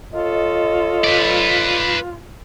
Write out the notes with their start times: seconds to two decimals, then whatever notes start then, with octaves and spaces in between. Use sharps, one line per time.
0.14 F4 A4 C#5 D#5
1.04 B4 D5